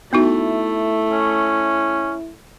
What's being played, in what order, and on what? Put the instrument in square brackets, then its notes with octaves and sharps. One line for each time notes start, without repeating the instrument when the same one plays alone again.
[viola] A3 [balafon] B3 D#4 F#4 [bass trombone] E4
[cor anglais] C#4